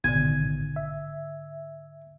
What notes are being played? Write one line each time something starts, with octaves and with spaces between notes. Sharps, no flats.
A1 G#2 B2 D3 D#3 G#5
E5